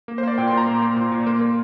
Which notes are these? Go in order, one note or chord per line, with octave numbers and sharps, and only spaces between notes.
A#3
C5
A#3 D5
A#2 G5
C6
A#2 A#5
A#3
A#3
A#2 C6
A#2
A#3
A#3